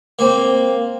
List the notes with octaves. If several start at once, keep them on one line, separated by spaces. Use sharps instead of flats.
A#3 C4